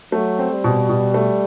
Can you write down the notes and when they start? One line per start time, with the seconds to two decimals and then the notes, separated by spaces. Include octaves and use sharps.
0.12 F#3 A3
0.39 C4
0.51 G3
0.64 B2
0.89 B2
1.14 A3